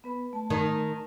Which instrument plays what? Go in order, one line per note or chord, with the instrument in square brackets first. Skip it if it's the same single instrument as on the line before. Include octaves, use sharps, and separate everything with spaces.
[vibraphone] B3 B4 B5
A3 A5
[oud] D#3